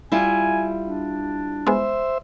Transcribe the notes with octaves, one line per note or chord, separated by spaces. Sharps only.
G3 E4 F4 G#5
D4
G#3 B3 C5 E5